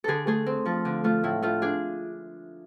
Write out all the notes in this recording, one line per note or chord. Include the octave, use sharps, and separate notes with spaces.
D3 G#4 A4
A3 G#4
C4
F3 A4
D3
A3 F4
A2 E4
A3 F4
D4 G#4